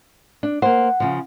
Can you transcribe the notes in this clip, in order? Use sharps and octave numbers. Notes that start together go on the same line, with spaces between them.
D4
A#3 C5 F#5
C#3 F3